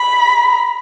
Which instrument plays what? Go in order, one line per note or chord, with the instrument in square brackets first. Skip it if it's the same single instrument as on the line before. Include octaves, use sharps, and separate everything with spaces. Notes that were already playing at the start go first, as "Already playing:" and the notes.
Already playing: [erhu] B5